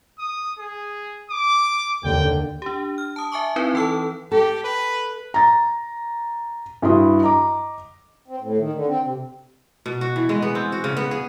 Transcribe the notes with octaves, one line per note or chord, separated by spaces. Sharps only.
D#6
G#4
D6
D#2 D3 G5
D4 G4
F6
A5 D#6
E5 G#5 A5 C#6 D6
C4 D#4 E4 B4
E3 A4 A5 E6
G4 A4
B4
A#5 A6
G2 E4 F#4 C6 D#6
D#5 A#5 D6
C4
A2
D#3
D3
C4
C3
B2
F#4
E3
G#3
B3
C4
F#4
C#3
B3
G#4